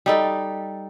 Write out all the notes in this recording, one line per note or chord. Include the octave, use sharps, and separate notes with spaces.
G3 D#4 A4